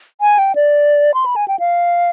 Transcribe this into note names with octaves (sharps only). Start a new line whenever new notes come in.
G#5
G5
D5
C6
B5
G#5
G5
F5